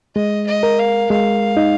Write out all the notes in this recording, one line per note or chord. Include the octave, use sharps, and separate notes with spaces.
G#3 D#5
D#5
A#4
F5
G#3 F5
D#4